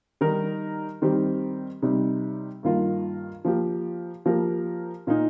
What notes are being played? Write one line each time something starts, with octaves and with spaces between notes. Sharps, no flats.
D#3 G3 D#4 A#4
D#3 G3 C4 G4
C3 G3 D#4
G2 D#3 A#3 F4 A#4
F3 A#3 G4
F3 A#3 G4 A#4
A#2 A#3 D#4